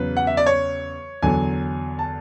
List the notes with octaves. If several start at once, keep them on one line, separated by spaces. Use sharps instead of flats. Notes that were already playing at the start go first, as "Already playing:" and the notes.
Already playing: E2 C#3 F#3 B4
F#5
E5
D5
C#5
E2 D3 F#3 G#5
A5